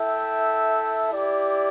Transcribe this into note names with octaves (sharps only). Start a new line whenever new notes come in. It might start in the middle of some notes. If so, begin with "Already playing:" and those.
Already playing: E4 A4 E5 G5
E4 G4 D5